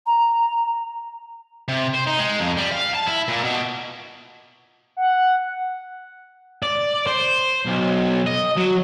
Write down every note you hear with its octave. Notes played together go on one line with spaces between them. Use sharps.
A#5
C3
C5
D#4
G#3
F2
G3
F5
A5
E4
A#2
B2
F#5
D5
C5
B1
D#5
F#3